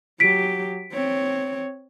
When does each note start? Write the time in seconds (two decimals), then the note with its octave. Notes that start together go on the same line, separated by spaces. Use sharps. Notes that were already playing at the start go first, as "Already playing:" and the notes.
0.20 F#3 G4 B6 D7
0.92 C4 C#5